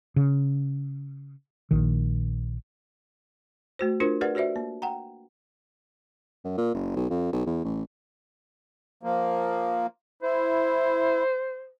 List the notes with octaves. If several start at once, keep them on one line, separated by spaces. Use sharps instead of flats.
C#3
A#1 D#3
A3 F#4 C5
D4 F4 A#4 C5
G4 A#4 B4 D5 F#5
F#4 G4 C5 D5 E5
A#3
F#5 G5 A#5
F#2
A#2
F#1
B1
F2
B1
E2
A1
F3 A#3
E4 C5